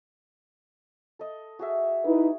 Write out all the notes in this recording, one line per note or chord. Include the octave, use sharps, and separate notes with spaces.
A4 D#5
F#4 G#4 E5
D#4 E4 B4